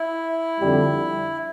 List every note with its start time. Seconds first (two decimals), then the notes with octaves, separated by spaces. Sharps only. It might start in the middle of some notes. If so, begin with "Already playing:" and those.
Already playing: E4
0.61 F2 D3 G3